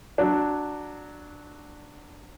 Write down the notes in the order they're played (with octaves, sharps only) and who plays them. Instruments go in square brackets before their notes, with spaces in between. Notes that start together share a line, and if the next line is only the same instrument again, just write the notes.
[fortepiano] F#3 D4